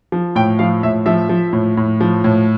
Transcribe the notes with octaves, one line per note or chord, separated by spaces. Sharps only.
F3
A2 G5
F3 F5
A2 E5
F3 E5
F3
A2
A2
F3
A2